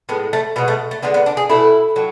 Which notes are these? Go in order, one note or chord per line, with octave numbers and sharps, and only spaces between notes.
A2 G#3 B3
A3
B2 G#3 B3
A3
A3
D3 G#3 B3
B3
D4
G#4
B2 A3 E4
A2 F#3